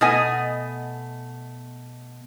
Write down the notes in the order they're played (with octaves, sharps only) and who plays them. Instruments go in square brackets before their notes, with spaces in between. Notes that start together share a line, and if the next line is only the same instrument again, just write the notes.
[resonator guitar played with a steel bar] B2 A3 B3 D#5 G#5